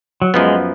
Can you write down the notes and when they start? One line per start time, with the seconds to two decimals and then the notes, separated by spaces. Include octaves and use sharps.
0.22 F#3
0.34 F#2 F3 G#3 B3